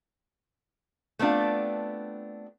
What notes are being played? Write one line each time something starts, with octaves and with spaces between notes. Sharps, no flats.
A3 B3 C4 D4 F4